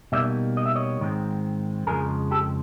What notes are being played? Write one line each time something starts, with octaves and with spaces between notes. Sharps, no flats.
B2 G3 A#3 D#4 D5 E5
D#5
E5
C#5 D#5
G#2 D#3 G#3 C4
F2 C#3 F3 G#3 G#4 A#4
G4 A4